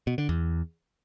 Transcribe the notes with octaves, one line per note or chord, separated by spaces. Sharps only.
B2
D3
E2